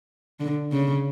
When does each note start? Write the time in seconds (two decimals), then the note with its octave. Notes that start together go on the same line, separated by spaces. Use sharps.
0.40 D3
0.72 C#3